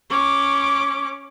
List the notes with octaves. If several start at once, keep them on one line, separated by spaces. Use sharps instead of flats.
C#4 D6